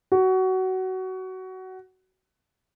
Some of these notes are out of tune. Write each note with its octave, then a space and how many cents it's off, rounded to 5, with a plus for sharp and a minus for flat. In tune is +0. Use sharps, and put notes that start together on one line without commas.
F#4 +20